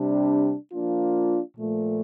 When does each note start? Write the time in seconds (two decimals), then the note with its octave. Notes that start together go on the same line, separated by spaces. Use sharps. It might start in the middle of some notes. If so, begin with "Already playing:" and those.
Already playing: C3 G3 D4
0.72 F3 A#3 D4 F4
1.57 A#2 F3 A3